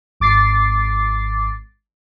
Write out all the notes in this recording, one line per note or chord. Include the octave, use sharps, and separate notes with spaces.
G#1 D6 A6 C7